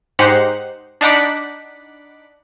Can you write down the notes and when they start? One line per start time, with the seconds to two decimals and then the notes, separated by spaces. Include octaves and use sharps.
0.19 G#2 D#4 G4 C5 F#5 C7
1.01 D4 D#4 F#5 B5 D6